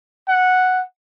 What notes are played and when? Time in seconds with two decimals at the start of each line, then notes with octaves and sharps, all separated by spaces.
0.28 F#5